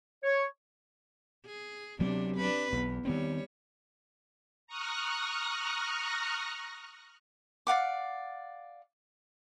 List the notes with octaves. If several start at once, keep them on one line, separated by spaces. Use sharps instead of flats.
C#5
G#4
D2 C3 F#3 B3 D4
D4 B4
B1 E2
D#3 G3 B3 C4 C#5
A#5 C#6 D#6 F6 F#6 A#6
D5 F5 F#5 D6